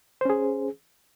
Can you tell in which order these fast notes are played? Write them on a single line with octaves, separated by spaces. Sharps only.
C5 C#4 G#4